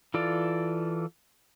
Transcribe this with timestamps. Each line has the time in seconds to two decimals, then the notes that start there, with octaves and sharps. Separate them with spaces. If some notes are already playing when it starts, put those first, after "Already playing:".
0.14 E3 F4 A4 D5